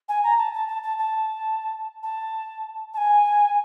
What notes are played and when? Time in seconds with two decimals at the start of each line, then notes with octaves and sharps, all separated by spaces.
0.09 G#5
0.24 A#5
0.38 A5
0.54 A5
0.68 A5
0.83 A5
0.99 A5
2.03 A5
2.94 A5
2.97 G#5